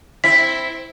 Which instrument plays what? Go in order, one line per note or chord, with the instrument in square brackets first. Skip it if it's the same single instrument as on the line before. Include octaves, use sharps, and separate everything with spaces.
[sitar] C4 E4 [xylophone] B6